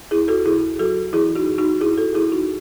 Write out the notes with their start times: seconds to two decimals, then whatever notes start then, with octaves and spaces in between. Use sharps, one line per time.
0.11 D#2 E4 G#4
0.28 F#4 A4
0.45 C#3 E4 G#4
0.79 F#3 F#4 A4
1.13 E3 E4 G#4
1.35 D#4 F#4
1.47 F#2
1.58 D#4 F#4
1.81 F#2 E4 G#4
1.97 F#4 A4
2.14 E3 E4 G#4
2.32 D#4 F#4